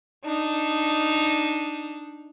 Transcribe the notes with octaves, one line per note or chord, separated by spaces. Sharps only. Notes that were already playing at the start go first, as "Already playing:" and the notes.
D4 D#4